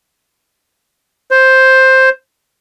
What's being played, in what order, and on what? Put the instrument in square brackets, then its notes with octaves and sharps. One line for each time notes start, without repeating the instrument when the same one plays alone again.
[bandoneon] C5